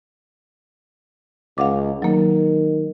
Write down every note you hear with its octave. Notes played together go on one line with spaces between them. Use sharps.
C#2 F5 F#5 D6
D#3 F#3 A#3